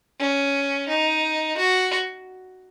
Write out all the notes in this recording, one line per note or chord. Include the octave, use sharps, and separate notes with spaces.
C#4
D#4
F#4